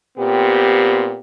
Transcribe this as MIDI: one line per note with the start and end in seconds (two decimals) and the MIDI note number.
0.18 1.19 46
0.18 1.19 59
0.18 1.19 60
0.18 1.19 67